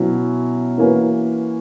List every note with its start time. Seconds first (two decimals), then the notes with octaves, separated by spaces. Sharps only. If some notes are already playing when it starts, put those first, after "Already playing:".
Already playing: B2 F#3 C#4 E4
0.78 E3 A#3 C#4 F#4 B4